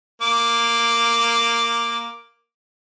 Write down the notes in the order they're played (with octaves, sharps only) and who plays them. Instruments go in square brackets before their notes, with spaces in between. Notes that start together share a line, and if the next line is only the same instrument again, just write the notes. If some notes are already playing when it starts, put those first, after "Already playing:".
[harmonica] A#3 D6